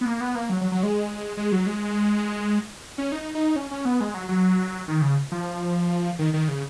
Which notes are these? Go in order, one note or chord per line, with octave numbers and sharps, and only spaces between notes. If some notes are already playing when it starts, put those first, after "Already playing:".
B3
A#3
B3
A#3
F#3
F#3
F#3
G#3
G#3
F#3
G#3
C#4
D#4
D#4
C#4
C#4
B3
G#3
F#3
F#3
D#3
C#3
F3
D#3
D#3
C#3